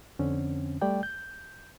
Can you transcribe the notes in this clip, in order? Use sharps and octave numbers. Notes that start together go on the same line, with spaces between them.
F2 D3 C4 C#4
G3 A3 D5 G5
G6